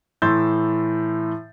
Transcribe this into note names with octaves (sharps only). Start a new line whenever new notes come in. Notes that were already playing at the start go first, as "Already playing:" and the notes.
A2 E3 C6 E6 G6 A6